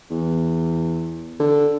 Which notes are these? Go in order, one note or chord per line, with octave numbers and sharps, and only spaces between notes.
E2
D3